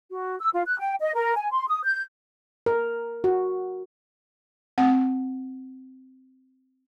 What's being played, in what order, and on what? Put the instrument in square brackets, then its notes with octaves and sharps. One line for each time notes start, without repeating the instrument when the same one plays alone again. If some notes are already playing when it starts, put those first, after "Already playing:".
[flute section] F#4
E6
F4
F#6
G5
D#5
A#4
G#5
C6
D#6
G6
[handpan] A#4
F#4
[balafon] C4 F#5